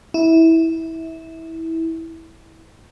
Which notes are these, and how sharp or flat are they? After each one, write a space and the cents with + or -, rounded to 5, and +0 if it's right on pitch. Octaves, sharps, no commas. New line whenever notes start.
E4 -20